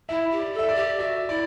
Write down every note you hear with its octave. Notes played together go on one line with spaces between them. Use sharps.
E4 E5
G4
D5
A4
E5
D5
G4
F#4 E5
E4 D5